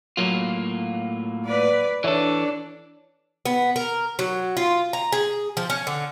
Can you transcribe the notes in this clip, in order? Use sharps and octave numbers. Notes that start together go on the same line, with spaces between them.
A2 F#3 A#3 F4
B4 D5
E3 D4 A4 C#5
B3
A#4
F#3
F4
A#5
G#4
F3
C#4
D3